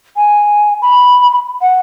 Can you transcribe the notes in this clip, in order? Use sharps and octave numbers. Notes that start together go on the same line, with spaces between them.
G#5
B5
F#5